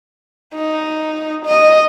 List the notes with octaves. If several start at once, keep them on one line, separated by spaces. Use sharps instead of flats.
D#4
D#5